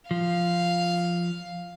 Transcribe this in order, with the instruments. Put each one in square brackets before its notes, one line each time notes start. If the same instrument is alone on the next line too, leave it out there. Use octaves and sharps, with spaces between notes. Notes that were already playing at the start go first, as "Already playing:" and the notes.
[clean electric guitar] F3 [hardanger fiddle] F5